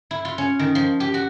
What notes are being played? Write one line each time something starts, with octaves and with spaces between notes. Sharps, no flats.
E4
F4
C#4
D#3
F3
G4
F#4